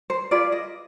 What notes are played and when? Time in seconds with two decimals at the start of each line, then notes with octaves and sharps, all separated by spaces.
0.10 C5
0.31 F4 G#4 B4 D5
0.52 D#5